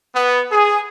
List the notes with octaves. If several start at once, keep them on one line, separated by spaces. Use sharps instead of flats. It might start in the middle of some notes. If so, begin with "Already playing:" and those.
B3
G#4